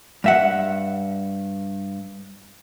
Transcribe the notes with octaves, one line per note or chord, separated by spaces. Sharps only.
G2 E5 F#5